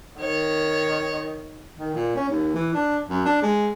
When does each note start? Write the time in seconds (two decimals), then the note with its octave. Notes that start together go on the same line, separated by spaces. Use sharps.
0.20 D#3 C#5
1.79 D#3
1.95 A#2
2.16 C#4
2.29 D#2
2.54 E3
2.74 D4
3.09 F#2
3.25 D4
3.42 G#3